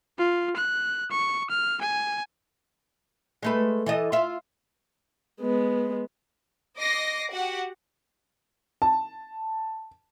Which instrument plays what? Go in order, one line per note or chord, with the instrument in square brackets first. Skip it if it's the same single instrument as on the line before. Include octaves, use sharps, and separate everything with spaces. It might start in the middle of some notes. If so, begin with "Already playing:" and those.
[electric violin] F4
F#6
C#6
F6
G#5
[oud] G#3 A3 B4
E3 A4 D#5
F4 E5
[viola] G#3 B3
[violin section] D#5 D6 A#6 C7
F#4 G4 F#5
[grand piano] A5